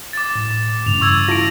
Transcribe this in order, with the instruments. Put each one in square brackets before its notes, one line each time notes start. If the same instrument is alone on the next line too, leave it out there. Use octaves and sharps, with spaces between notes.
[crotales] D6 A6
[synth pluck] A2
[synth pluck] G2 C#3 E3 [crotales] F7
[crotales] C#6 E6 G#6
[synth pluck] E4 F4 A5 [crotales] A#6 D7